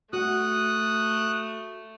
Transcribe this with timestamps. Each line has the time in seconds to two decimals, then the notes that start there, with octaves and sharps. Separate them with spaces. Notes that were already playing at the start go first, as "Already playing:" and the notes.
0.13 A3 F#4 F#5 D#6 F#6